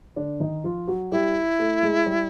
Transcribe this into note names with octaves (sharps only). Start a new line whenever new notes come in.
D3 D4
D#3 D#4
F3 F4
F#3 F#4
G3 E4 G4
A3 A4
G#3 G#4
G3 G4